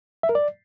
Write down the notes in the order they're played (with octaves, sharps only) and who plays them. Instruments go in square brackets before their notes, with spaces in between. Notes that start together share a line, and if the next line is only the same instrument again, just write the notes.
[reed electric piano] E5
A#4
D5